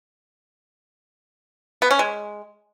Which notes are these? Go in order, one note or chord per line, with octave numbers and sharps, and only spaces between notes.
B3
C#4
G#3